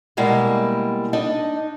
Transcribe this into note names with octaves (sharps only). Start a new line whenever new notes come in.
B2 G3 G#3 A#3 E4
D4 D#4 D#5